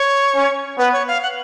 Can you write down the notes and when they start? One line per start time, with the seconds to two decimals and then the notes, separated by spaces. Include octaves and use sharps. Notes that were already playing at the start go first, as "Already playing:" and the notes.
Already playing: C#5
0.35 C#4
0.78 B3 B4
0.93 C#5
1.08 F5
1.22 F#5